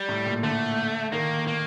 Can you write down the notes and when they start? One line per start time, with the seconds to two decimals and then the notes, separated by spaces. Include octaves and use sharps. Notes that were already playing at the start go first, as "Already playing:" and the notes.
Already playing: G3
0.09 A2
0.26 A#2
0.43 D3 A3
1.12 D#3 A#3
1.47 A#3